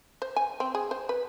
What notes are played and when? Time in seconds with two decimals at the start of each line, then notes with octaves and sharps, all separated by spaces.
0.22 C5
0.36 G#5
0.60 C4
0.75 G#4
0.91 C5
1.09 B4